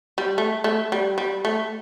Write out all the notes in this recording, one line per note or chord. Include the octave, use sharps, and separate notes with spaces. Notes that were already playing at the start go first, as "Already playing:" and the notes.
G3
A3
A3
G3
G3
A3